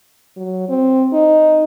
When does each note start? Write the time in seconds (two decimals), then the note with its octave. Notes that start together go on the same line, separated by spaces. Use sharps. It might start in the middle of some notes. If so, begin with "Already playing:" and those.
0.37 F#3
0.69 C4
1.13 D#4